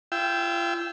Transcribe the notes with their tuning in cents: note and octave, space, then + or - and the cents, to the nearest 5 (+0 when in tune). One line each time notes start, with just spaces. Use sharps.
F4 -40 G5 +0 E6 +0